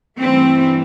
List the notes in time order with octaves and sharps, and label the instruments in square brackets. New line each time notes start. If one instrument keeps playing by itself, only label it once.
[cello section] G2 E3 A3 C4